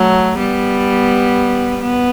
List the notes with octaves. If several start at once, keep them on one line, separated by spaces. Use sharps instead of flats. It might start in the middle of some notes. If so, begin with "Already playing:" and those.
Already playing: F#3 A3
G3 B3
B3